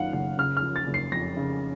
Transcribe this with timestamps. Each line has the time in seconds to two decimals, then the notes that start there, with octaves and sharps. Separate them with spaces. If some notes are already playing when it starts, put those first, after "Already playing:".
Already playing: F#1 F#2 D#3 F5 F#5
0.13 F#1 F#5
0.38 C#3 F6
0.57 F6
0.62 F3
0.76 A6
0.87 F#1
0.94 C7
1.12 F2 A#6
1.37 C#3